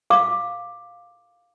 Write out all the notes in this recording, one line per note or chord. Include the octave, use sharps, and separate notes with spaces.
F5 D6